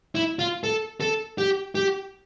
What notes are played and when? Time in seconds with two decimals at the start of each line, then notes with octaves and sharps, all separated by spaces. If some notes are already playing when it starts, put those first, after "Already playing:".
0.15 E4
0.39 F4
0.64 A4
1.01 A4
1.38 G4
1.75 G4